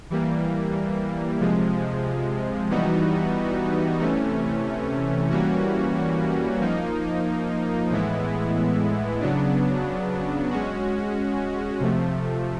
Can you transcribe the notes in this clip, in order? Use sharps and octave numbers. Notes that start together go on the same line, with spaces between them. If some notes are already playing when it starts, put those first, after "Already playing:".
E3 G3 A#3
C3 F3 G#3
E3 G3 B3 D#4 F#4
C3 E3 A3 C#4
E3 G3 A#3 C#4 F#4
F3 A#3 D#4
A2 E3 G#3 B3 E4
C#3 F#3 B3 D4
G#3 C#4 F#4
C3 F3 A3